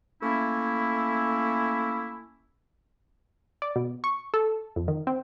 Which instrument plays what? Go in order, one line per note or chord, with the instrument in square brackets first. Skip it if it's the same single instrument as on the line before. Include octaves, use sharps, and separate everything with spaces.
[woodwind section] A3 A#3 C#4 E4
[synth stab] D5
B2
C#6
A4
F2
D#3
C4